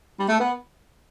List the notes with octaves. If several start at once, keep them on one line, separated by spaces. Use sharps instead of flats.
G3
A3
B3